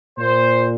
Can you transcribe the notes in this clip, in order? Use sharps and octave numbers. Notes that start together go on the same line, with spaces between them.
A#2 C5